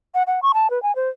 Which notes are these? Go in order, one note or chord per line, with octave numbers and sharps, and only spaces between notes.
F#5
F#5
C#6
A5
B4
G#5
C5